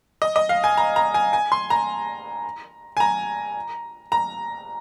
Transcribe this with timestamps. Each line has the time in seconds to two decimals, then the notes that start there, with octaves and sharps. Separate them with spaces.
0.22 D#5
0.36 D#5
0.49 F5
0.64 G#5
0.77 A#5
0.96 A#5
1.14 G#5
1.33 G#5
1.52 C6
1.70 A#5
2.97 G#5
3.00 A#5
4.12 A#5